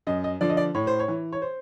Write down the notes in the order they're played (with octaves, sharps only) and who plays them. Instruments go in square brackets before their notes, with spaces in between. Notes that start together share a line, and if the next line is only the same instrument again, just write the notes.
[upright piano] F#2 D#5
D#5
D3 F3 D5
D#5
D5
A2 C#5
C5
C#5
E3
C#5
C5